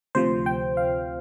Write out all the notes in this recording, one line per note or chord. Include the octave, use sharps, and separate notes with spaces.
D2 C3 F3 C5
G5
F5